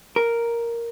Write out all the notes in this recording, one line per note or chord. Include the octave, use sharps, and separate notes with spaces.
A#4